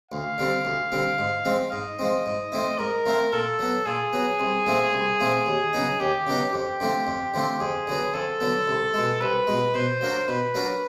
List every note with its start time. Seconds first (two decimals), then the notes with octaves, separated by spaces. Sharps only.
0.11 D2 F5
0.38 D3 G3 C4
0.65 D2
0.92 D3 G3 C4
1.18 G#2
1.45 F3 G#3 C4
1.72 G#2 D#5
1.99 F3 G#3 C4
2.26 G#2
2.52 F3 A3 C4 E4
2.79 G#2 A#4
3.06 F3 A3 C4 E4
3.33 A#2 A4
3.59 F#3 B3
3.86 A#2 G#4
4.13 F#3 B3
4.40 C2
4.66 A#2 F3 A3 C4
4.93 C2
5.20 A#2 F3 A3 C4
5.46 D#2
5.73 C#3 F#3 B3 D#4
6.00 D#2 G4
6.27 C#3 F#3 B3 D#4
6.53 F2 G4
6.80 D3 F3 A3 C4
7.07 F2
7.34 D3 F3 A3 C4
7.60 F2 G#4
7.87 D3 F#3 B3
8.14 F2 A4
8.40 D3 F#3 B3
8.68 C2
8.94 B2 G#3
9.20 C2 B4
9.47 B2 G#3
9.74 B2 C5
10.01 F#3 A#3 D4 F#4
10.28 B2 B4
10.54 F#3 A#3 D4 F#4